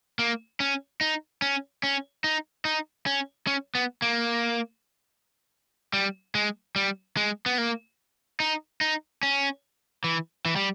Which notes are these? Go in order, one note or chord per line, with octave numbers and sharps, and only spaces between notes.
A#3
C#4
D#4
C#4
C#4
D#4
D#4
C#4
C#4
B3
A#3
G3
G#3
G3
G#3
B3
A#3
D#4
D#4
C#4
E3
E3
G3